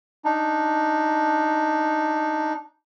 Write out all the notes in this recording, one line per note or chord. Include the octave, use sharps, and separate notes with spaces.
D4 D#4